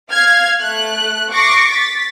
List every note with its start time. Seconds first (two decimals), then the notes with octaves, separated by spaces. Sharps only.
0.10 F5 F6 G#6
0.62 A3 F#6
1.32 C#6 D6 A#6 C7
1.71 A6 B6